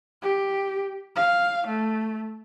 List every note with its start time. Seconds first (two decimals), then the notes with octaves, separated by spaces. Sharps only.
0.22 G4
1.16 F5
1.67 A3